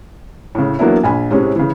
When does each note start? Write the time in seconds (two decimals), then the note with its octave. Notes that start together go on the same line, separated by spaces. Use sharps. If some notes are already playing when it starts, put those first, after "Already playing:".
0.55 A2 C#3
0.79 E3 F#3 A#3 B3 D4 E4
1.04 A#1 G#5 B5
1.31 A2 C3 G#3 C#4
1.56 C#3 E3